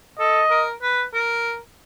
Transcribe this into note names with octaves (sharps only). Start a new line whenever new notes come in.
A4 D#5
A#4
B4
A#4